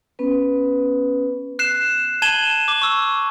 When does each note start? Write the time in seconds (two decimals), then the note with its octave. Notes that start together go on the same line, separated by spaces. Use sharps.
0.19 B3 C#4 B4
1.59 F#6 C7 E7
2.22 A5 G#6 D#7 E7 F#7 G7
2.68 D6
2.82 C#6 E6